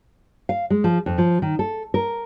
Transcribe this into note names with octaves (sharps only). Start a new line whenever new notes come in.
F5
G#3
F3
F2
F3
D#3
A4
A#4